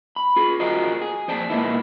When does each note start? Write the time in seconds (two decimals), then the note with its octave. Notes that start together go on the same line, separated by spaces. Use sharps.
0.16 B5
0.36 F4 G#4
0.60 F4 F#4 G#4 A#4 C5 D#5
1.02 G#4
1.28 F2 C5 D5 A5
1.50 A#2 G#3 A#3 B3 D#4 E4